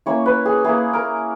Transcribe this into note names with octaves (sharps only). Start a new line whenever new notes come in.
A#3 C#4 E4 C#5
B4
G#4
A#3 E4 G#4
A#4